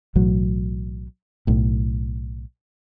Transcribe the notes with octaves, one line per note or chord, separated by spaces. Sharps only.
B1 A2 E3 F#3
B1 A2